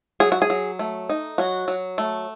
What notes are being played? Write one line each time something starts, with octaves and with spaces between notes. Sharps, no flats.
F#3 G#4
F#4
G#4
F#3
A3
D#4
F#3 F#4
F#3
A3